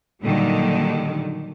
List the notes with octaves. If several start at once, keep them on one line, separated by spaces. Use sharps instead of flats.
A#2 D3 D#3 F#3 G3